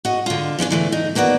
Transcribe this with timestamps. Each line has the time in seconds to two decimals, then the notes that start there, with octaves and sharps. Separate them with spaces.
0.05 F#4 D#5
0.26 D3 F4
0.59 F3 C#4 D4 D5
0.70 D3 E3 A3
0.92 D#4
1.15 D#2 A#3 B3 F#4 D5